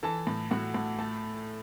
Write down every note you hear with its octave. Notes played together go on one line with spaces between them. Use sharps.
E3 A4 A5
A2
A2 F#4 F#5
A2
A3 A4 A5